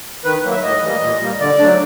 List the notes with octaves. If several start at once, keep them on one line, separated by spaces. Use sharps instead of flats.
D#3 B4
F#3 A#3
E5
A2 D#5
E3 G3 A#3
A#2
G3 A#3
D3 D5
F#3 A3 D4